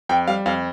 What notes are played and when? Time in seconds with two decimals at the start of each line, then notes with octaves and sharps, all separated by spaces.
0.09 F2 G5
0.28 G3 F5
0.46 F2 F5